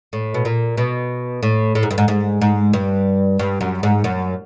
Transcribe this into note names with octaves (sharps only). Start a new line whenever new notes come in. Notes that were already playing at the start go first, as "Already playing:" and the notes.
A2
B2
A#2
B2
A2
A2
G#2
G2
G#2
G#2
G#2
G2
G2
F#2
G#2
F#2